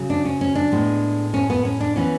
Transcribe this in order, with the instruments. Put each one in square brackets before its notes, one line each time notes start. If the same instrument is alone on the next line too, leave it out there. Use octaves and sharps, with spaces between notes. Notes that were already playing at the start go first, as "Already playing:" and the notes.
Already playing: [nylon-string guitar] C#3 F#3
D4
C#4
C#4
D4
A2 G#3 B3
C#4
B3
C#4
D4
E3 B3 C#4